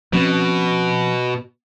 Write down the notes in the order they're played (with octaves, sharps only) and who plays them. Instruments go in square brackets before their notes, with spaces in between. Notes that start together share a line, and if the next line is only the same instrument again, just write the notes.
[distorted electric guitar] B2 [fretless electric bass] F3 C4 C#4